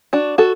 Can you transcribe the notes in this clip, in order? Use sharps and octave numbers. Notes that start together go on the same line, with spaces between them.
D4 F#4
F#4 A4